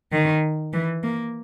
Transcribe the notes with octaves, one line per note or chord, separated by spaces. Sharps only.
D#3
E3
A#3